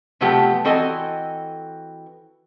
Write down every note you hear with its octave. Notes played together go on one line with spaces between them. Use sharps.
C3 F3 F#3 A3 B3 G4
E3 C4 F#4 A4 D#5 G#5